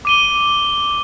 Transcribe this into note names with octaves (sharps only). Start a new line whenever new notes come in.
D6 D#7 G7